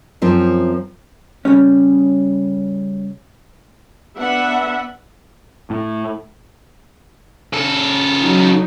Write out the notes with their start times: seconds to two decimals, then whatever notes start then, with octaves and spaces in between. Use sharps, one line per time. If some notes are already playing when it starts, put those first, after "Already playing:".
0.22 F#2 F3 C4
1.45 C#3 G3 C#4
4.18 B3 D4 B4 E5 F#5
5.70 A2
7.53 C#3 A4
8.21 F#3 D#4